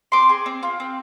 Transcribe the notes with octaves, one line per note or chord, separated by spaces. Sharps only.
C4 C6 D6
G#4
C4
F4
C4